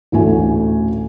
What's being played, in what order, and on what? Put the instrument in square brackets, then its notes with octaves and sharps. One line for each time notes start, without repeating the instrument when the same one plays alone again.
[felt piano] A1 D2 A3 G#5